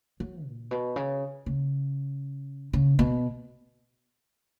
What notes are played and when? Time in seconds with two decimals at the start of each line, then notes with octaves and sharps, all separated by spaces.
0.20 F#3
0.46 A#2
0.71 B2
0.96 C#3
1.46 C#3
2.73 C#3
2.99 B2